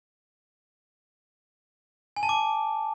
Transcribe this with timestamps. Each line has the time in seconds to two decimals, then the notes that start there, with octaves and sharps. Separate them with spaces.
2.16 G#5
2.23 A5
2.29 D6